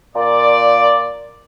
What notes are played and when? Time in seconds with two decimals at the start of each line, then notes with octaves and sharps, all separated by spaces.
0.15 A#2 D5